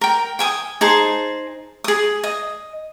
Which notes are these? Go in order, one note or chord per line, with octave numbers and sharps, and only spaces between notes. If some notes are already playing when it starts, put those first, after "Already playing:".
A#4 G5
G5 G#5 D#6
D#4 G#4 C5 A5
G#4 D#6
D#5